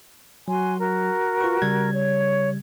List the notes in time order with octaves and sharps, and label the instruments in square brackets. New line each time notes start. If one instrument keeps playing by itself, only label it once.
[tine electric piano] F#3 [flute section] F#4 G#5 C6
[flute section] F#4 A#4
[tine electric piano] F4 B4 C#6
C#3 G3 G#6
[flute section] C#5